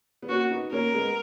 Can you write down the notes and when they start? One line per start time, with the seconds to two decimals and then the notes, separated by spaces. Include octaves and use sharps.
0.22 B3
0.29 A#3 C#4 F#4
0.51 B3 D#4
0.72 A#3 C#4 A#4
0.94 G#3 B3